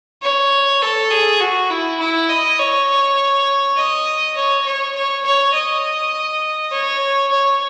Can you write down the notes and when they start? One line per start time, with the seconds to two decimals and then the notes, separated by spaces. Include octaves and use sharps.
0.22 C#5
0.82 A4
1.11 G#4
1.40 F#4
1.70 E4
2.00 E4
2.29 D#5
2.59 C#5
3.77 D#5
4.36 C#5
4.66 C#5
4.95 C#5
5.24 C#5
5.54 D#5
6.71 C#5
7.31 C#5